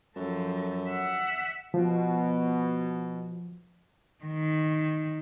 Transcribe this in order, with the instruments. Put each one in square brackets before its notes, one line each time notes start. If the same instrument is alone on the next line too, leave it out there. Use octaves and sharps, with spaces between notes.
[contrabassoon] F#2 [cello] F3 A4
[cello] E5 F#5
[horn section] B2 [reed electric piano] F3
[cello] D#3